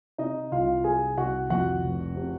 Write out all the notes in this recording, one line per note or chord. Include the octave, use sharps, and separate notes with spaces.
C3 D#4 D#5
C2 F4 F5
F#3 G#4 G#5
C2 F#4 F#5
F2 F#4 F#5
F1
C3